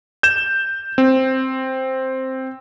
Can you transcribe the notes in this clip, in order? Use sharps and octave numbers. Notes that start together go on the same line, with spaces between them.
G6 E7
C4